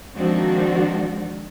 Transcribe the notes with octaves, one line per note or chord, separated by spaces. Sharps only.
D#3 F3 G#3 C4 D4 F#4